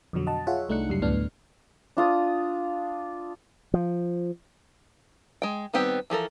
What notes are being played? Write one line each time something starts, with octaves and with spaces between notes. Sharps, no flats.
F2 B2 D3 F#3
D#5 F#5 A5
F4 G#4 C#5 E5 F#5
C2 A3 D4 D#4 F#6 C#7
C#2 F#2 G3 C7
D2 A2 B3 D4 F6
D4 F4 D#6
F3
G#3 G5
D#3 G3 B3 C4 G4
E3 F3 A4 A#4